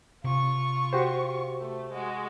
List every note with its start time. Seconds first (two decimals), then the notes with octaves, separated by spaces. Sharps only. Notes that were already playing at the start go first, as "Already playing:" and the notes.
0.24 C3 F4 C#6
0.93 F#4 G4 C5
1.58 A3
1.92 G#3 F#4